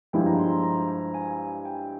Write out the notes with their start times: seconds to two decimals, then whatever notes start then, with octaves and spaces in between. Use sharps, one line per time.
0.13 G2 F3 G#3 E4 G5
0.26 A#5
0.39 C6
0.51 A#5
0.63 A#5
0.89 A#5
1.14 G#5
1.65 G5